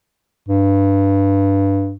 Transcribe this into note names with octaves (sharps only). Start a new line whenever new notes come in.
G2